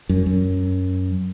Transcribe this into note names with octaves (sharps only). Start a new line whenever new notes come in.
F#2
F#2